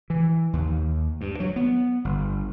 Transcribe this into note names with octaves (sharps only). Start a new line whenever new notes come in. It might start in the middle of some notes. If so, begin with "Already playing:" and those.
E3
D#2
G2
F#3
B3
G1